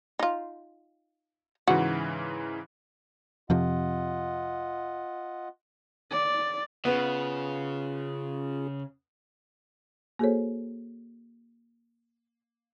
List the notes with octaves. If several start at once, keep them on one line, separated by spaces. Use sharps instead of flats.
D#4 F4
G#2 C#3 E3 F#4
F2 C3 F3 F4 D#5 F#5
D5
C#3 B3 C#4 F4 G#4
A#3 F#4 G#4 A4 C5 C#5